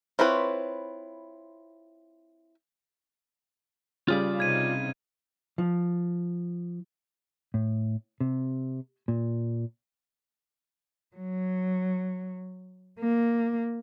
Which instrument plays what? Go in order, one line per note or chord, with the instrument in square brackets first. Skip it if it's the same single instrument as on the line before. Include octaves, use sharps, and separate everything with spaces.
[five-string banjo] C4 E4 F4 B4 C#5
[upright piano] C#3 G3 [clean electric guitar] F4 G#4 D5
[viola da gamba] C3 C4 D#4 [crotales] G#6 D#7
[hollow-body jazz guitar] F3
A2
C3
A#2
[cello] F#3
A#3